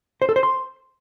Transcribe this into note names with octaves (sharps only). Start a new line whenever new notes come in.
C5
A4
C5
C6